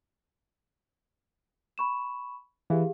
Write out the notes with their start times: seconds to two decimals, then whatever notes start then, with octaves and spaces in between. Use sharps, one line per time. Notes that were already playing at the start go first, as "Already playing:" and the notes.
1.78 B5 C#6 E7
2.70 E3 G4 G#4 F5